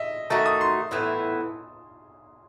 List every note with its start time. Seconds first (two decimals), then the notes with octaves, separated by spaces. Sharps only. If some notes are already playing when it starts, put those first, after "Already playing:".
Already playing: D#5 E5
0.30 D#3 A3 D#4 F#4 A5
0.46 D#6
0.61 C6
0.91 A2 E3 B3 E4